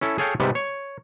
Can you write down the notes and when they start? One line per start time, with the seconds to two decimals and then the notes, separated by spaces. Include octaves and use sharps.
0.01 C#4 E4 A4
0.18 G#4 A4 C#5 F5 G5 A5
0.40 G#2 C3 G3 B3
0.55 C#5